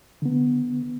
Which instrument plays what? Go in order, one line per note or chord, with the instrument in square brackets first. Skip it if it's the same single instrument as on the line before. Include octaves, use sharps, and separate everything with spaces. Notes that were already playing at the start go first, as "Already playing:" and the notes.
[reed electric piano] D3 B3